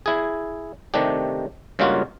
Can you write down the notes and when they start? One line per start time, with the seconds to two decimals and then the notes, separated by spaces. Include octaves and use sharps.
0.06 E4 G#4
0.94 C3 D#3 A3 D4 G4
1.79 G2 C#3 G#3 A#3 F4 F#4